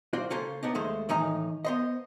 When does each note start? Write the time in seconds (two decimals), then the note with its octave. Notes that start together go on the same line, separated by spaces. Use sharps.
0.13 F4 F#4 C5 D5
0.30 C#3 A#3 C#4 A4 C5
0.63 B3 D4 D#4
0.74 D#2 G#3 A3 C5
1.09 A2 D#3 E3 D#4 G#5 A#5
1.65 B3 C5 D#5